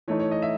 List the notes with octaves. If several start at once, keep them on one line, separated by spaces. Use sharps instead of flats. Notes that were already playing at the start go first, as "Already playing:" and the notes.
E3 A3 D#4 C#5
C#5
D#5
E5